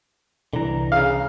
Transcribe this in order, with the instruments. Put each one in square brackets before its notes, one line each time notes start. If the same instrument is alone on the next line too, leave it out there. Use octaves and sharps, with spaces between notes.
[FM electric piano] C2 A#5 [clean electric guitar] D3 E3
[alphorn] C#3 [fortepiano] F5